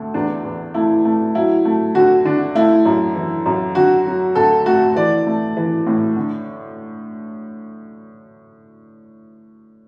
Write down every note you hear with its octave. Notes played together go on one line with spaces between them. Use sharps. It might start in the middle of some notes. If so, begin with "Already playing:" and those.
Already playing: D2 A3
E2 D4
E2
A3 E4
A3
F#3 E4
A3
D3 F#4
D3 D4
A3 E4
F#2
E3
F#2
D3 F#4
F#3
D2 A4
A3 F#4
E3 D5
A3
E3
A2
D3